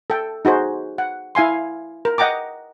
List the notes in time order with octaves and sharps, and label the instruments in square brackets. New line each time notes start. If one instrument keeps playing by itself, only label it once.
[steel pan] A4 G5
D#4 F#4 G#4 C5
F#5
E4 F5 G#5 C6
A#4
D#5 F#5 G5 A#5 D6